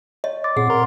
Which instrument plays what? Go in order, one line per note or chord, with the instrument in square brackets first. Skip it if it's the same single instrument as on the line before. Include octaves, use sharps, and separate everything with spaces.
[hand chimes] C#5 [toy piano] D#5
[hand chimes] C6 D6 A6
[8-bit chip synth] A#2 [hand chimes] C4 F#5 C7 [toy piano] G#4
[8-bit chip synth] A#4 A#5 C6